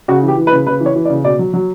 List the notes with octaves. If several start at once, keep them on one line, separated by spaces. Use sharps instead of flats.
C#3 F#4
E3 G4
E3
B4
C#3
C#3 B4
E3
C#5
E3
D5
C#3
B2 D5
F#3
F#3